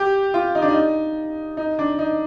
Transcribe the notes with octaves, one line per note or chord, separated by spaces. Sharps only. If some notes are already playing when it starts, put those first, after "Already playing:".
Already playing: G4
F4
D#4
D4
D#4
D#4
D4
D#4